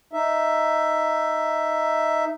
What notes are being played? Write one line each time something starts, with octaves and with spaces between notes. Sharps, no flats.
D#4 E5